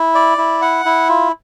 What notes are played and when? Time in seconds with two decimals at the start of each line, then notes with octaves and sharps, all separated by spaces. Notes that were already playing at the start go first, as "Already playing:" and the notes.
Already playing: E4
0.15 D5
0.38 E4
0.62 F#5
0.85 E4
1.09 F4